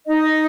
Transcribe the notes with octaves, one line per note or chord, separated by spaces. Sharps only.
D#4 D#5